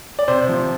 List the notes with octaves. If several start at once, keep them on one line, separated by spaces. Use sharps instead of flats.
D5
C3 C5
F3